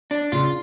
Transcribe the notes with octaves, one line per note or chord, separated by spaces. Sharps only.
D4
C#3 F4